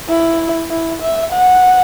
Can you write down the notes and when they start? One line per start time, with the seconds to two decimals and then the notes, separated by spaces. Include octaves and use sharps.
0.08 E4
0.71 E4
1.02 E5
1.33 F#5